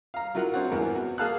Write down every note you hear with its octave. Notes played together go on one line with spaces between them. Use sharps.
F5 A#5
F#3 E4 F4 A#4 F#5
C4 D4 F#4 C#5 F#5
G#1 E2 E3 B3 A#4
F#4
A#3 G#4 F5 A5 F6 F#6